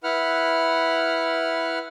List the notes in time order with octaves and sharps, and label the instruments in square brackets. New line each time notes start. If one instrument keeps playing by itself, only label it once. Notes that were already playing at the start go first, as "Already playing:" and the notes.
[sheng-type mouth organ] E4 B4 F#5 F6